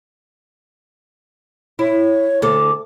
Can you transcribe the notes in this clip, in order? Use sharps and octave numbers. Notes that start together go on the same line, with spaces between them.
E4 C#5
D2 A4 D6